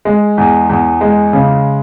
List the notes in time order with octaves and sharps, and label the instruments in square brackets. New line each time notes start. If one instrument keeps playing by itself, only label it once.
[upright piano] G#3
E2
E2
G#3
C#3